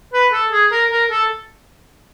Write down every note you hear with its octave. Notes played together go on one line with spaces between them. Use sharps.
B4
A4
G#4
A#4
A#4
A4